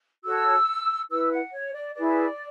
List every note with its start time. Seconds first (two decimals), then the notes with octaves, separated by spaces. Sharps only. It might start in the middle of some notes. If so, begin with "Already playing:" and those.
0.24 F#4 A4 C#5 E6
1.09 E4 B4 E6
1.31 F#5
1.52 C#5
1.73 D5
1.94 E4 G#4 B4 D5